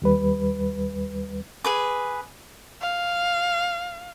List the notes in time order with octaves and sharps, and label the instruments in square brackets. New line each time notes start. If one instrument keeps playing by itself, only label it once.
[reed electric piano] D#2 G3 B4
[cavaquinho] G#4 B4 D6
[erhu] F5